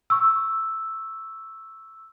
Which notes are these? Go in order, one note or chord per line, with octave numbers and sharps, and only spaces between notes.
C#6 E6